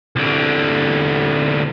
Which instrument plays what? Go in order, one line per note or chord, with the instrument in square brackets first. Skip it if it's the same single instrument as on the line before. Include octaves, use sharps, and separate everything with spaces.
[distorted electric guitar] C2 D3